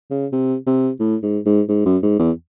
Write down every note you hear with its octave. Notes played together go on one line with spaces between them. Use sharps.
C#3
C3
C3
A2
G#2
G#2
G#2
F#2
G#2
E2